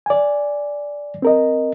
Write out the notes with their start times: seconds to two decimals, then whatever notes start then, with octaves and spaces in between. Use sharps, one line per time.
0.06 D5 G#5
1.22 C4 A#4 D#5